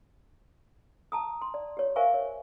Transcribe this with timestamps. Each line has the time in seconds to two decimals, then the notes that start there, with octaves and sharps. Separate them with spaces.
1.12 A5 A#5 D#6
1.42 C6
1.54 D5
1.77 G4 C#5
1.96 A#4 C5 E5 F5 G#5 C#6
2.14 C#5